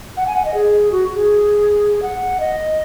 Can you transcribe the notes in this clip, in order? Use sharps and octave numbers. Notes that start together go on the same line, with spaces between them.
F#5
G#5
F#5
D#5
G#4
F#4
G#4
F#5
D#5